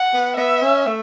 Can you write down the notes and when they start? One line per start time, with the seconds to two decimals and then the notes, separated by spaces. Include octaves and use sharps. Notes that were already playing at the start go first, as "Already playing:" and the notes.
Already playing: F#5
0.13 B3
0.37 B3 E5
0.62 C#4
0.86 A3